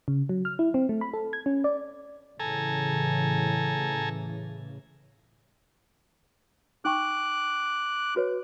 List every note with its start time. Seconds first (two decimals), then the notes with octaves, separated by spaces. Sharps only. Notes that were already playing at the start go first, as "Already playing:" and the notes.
0.08 C#3
0.29 F#3
0.45 F6
0.59 E4
0.74 C4
0.89 A3
1.01 B5
1.14 A4
1.33 G#6
1.46 C#4
1.64 D5
2.40 A2 C#3 E3 A4 G#5 A#5
6.85 D#4 G5 C#6 D6 F#6
8.16 F#4 B4 C#5